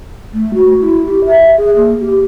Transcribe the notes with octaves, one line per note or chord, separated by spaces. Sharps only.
A3
F#4
E4
G4
E5
G#4
A#3
G4